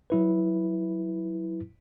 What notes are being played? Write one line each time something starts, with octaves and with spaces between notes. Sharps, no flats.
F#3 E4 B4